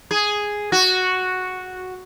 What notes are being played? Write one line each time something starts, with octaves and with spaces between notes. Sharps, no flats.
G#4
F#4